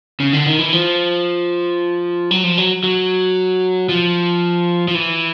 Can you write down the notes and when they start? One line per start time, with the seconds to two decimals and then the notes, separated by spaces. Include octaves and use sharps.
0.20 C#3
0.33 D3
0.47 D#3
0.59 E3
0.73 F3
2.31 F#3
2.44 F3
2.58 F#3
2.84 F#3
3.89 F3
4.88 F3
4.95 E3